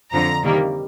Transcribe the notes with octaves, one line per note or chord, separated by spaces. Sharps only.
F2 D3 F3 A#5
C3 D#3 G3 A#3